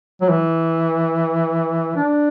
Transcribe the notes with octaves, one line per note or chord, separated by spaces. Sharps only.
F#3
E3
D4